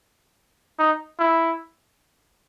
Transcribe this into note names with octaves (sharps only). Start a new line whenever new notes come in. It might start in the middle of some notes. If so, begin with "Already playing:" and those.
D#4
E4